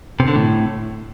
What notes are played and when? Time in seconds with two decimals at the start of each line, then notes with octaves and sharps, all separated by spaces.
0.20 C3
0.28 D3
0.35 A2